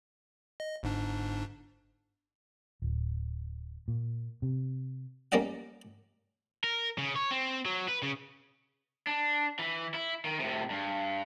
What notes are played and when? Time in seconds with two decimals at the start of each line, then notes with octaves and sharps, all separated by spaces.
0.60 D#5
0.83 G1 G#2 D4
2.82 D1
3.88 A#2
4.42 C3
5.32 G3 A#3 C#4 D5 D#5 F#5
6.64 A#4
6.98 C#3
7.16 C#5
7.31 C4
7.66 F#3
7.88 B4
8.03 C#3
9.07 D4
9.59 E3
9.94 E4
10.25 D#3
10.40 A2 C3
10.70 G2